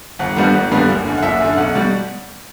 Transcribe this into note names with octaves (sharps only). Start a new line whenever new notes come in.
G1 F#5
G2 D3 G3 B3 F#5
G1
G2 D3 G3 B3
F#1
F#2 D3
F#5
F#1 E5
F#2 D3
B1 F#5
B2 G3